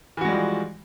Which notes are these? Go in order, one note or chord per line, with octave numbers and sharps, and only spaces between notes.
E3 F3 G3 G#3 F#4